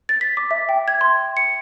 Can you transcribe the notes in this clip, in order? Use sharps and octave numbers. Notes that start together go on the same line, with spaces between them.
A6
B6
D6
E5
G5
G#6
C6
C#7